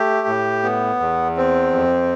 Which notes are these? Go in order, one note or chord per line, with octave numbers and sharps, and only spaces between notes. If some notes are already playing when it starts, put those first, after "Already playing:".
Already playing: A3 G4
A2
B3
E2
C4
F2